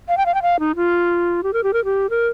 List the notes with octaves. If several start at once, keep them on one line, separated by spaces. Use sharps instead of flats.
F5
G5
F5
G5
F5
D#4
F4
G4
A#4
G4
A#4
G4
A#4